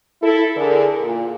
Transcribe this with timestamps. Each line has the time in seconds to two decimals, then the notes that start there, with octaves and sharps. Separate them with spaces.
0.22 E4 A4
0.57 D3 G#4 A#4
1.01 A#2